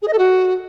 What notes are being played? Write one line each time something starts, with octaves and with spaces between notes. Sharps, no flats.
G#4
D#5
A4
F#4